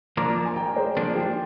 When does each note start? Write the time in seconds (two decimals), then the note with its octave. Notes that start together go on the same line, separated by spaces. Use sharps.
0.17 F3 A#3 D4 A#5 D6
0.45 G#5
0.56 G5 A#5
0.76 G#4 C5
0.97 F3 A#3 D4
1.15 G4